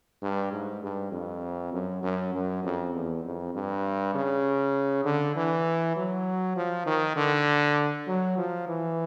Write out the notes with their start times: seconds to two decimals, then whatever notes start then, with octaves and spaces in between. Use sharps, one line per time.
0.22 G2
0.52 G#2
0.83 G2
1.12 F2
1.72 F#2
2.03 F#2
2.33 F#2
2.64 F2
2.94 E2
3.24 F2
3.55 G2
4.14 C#3
5.04 D3
5.36 E3
5.96 F#3
6.56 F3
6.86 D#3
7.16 D3
8.07 F#3
8.38 F3
8.68 E3